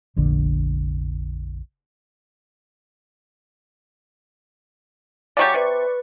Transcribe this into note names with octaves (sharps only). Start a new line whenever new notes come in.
F1 A#1 D3
C#3 F#3 G4 D5 C#6
C3 B4